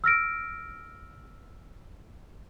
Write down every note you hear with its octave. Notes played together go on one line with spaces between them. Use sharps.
E6 F6 A#6 D7